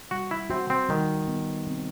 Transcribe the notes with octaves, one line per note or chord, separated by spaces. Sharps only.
G3 F#4
E4
C4 F#4
C4
D#3 G3
B3
C4